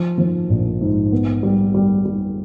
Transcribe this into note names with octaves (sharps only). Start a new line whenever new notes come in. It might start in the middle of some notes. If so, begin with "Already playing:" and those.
Already playing: F3
F3
A#1
G#2
B3
G3
G3
G3